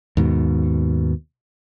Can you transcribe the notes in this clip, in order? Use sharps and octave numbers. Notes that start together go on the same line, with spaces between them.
D#2 G#2 B2